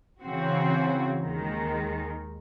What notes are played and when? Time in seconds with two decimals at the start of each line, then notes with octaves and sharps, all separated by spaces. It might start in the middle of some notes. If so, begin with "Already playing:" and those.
0.22 C#3 E3 C4 F#4
1.22 D#2 D#3 G#3